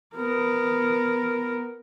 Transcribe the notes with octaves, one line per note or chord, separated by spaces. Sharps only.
B3 A#4